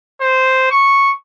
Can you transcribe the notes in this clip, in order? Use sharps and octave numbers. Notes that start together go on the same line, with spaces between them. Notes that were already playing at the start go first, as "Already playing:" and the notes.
C5
C#6